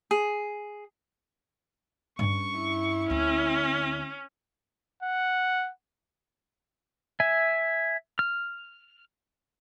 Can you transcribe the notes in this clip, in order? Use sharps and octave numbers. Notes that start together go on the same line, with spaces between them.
G#4
G2 C#4 C#6
E4
D2 C4 C#4
F#5
E5 G#5
F6